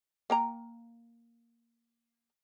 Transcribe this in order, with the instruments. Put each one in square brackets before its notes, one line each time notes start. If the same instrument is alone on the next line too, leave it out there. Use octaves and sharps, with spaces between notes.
[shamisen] A#3 G5 A#5